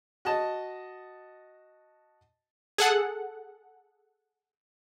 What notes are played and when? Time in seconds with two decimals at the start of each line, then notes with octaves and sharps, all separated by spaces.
0.25 F#4 D#5 A5
2.78 G#4 A4 F#5